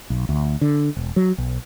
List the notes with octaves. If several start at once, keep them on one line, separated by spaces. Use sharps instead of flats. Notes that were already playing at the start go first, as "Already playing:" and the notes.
B1
D2
D3
E1
F#3
B1